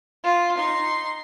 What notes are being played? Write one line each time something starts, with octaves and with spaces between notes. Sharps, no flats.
F4
D#4 C6